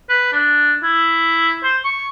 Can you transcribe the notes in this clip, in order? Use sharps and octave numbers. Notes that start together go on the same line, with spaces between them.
B4
D4
E4
C5
C#6